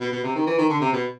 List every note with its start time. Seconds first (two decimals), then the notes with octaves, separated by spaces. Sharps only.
0.01 B2
0.12 B2
0.24 C3
0.36 D#3
0.47 E3
0.58 D#3
0.70 D3
0.81 C3
0.93 B2